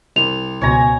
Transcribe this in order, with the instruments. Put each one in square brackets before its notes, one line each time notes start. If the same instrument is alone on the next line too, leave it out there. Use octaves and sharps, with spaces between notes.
[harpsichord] C2 [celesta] F7
[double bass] C#2 B2 [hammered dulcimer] C#5 G#5 A#5